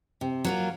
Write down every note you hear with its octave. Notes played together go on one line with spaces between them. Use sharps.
C3
F#3 A#3 F4